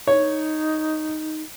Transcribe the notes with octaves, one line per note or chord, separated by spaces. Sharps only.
D#4 C#5